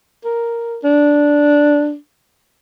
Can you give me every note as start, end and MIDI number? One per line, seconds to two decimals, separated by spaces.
0.24 0.77 70
0.84 1.95 62